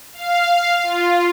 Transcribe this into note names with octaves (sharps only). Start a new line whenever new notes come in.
F5
F4